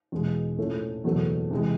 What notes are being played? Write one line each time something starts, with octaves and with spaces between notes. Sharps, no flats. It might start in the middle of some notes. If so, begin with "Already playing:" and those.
E2 B2 G#3
A#1 A2 F3 A3 C#4
F#1 E2 B2 F#3 A3
C3 E3 G#3